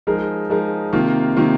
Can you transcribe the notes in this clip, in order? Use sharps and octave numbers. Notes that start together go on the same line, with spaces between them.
F3 G#3 D#4 A#4
F3 G#3 D#4 A#4
C3 D#3 A#3 F4
C3 D#3 A#3 F4